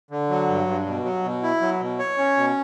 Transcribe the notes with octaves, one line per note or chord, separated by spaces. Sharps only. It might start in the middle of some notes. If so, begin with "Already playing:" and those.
D3
F#3
G2
G2
B2
F#3
B2
E4
F#3
B2
C#5
C#4
B2